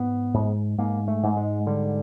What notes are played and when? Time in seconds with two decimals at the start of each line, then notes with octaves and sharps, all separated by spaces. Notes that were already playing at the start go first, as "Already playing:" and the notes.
Already playing: G#2 B3
0.34 G#2
0.78 G#2 A#3
1.08 A3
1.23 G#2
1.37 G#3
1.67 D3 G3